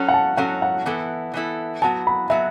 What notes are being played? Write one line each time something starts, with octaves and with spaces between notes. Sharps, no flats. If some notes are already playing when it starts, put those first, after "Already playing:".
Already playing: F#3 C#4 F#4 A4
F#5
A5
F#3 C#4 F#4 A4 F#5
F#5
E3 B3 E4 A4
E3 B3 E4 A4
F#3 B3 F#4 A5
B5
F#3 B3 F#4 E5